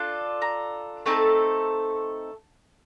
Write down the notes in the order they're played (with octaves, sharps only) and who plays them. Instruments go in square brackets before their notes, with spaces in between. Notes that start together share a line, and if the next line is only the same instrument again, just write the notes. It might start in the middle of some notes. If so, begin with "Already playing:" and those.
Already playing: [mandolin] D4 F4 A4
A#5
A3 C4 D#4 A4 A5